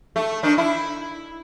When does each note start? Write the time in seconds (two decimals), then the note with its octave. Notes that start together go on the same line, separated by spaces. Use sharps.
0.16 A3
0.43 D#3 D4
0.58 E4